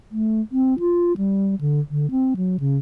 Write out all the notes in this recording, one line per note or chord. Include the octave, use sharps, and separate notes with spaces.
A3
C4
F4
G3
D3
D3
C4
F#3
C#3